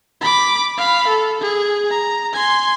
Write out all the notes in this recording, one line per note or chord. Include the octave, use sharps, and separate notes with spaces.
B5 D6
F5 B5
A4
G#4
A#5
G#5 C6